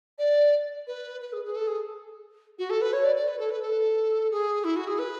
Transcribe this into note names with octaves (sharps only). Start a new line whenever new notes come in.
D5
B4
B4
G#4
G#4
A4
G#4
F#4
A4
B4
C#5
D5
D5
B4
A4
B4
A4
G#4
E4
F#4
G#4
B4